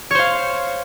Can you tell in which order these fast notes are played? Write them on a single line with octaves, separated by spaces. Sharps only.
C#5 C5 F5